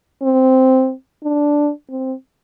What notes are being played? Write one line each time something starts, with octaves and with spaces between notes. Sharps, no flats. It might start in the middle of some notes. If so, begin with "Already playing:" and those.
C4
D4
C4